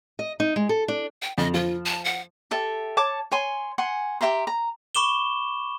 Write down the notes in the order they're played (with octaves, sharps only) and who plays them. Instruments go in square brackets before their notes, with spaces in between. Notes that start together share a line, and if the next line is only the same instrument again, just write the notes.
[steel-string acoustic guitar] D#5
D#4
G#3
A4
D4
[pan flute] G5
[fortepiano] F2 [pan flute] D#5
[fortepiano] F3 [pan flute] F4
[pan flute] A5
F#5
[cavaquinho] G4 A4 E5
C#5 A5 D6
C#5 G#5 C6
F#5 G#5 C6
G4 E5 A#5 C6
A#5
[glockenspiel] B5 C#6 D6 E7 G7